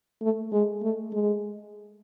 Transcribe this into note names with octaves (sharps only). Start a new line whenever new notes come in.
A3
G#3
A3
G#3